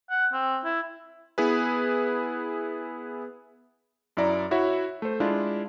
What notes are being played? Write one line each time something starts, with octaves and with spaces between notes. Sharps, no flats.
F#5
C4
E4
B3 E4 G#4 B4
F#2 E4 D5 A#5
E4 F#4 C#5 E5
A3 C5
G#3 D4 E4 F4